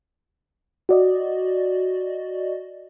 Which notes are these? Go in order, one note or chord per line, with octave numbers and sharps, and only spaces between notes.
F#4 D5 D#5